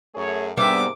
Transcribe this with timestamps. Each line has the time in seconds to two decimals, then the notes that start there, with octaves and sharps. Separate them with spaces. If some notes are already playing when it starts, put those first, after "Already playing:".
0.15 F#2 A3 G#4 C#5
0.57 G#2 C3 G3 A#3 B3 D4 E5 D6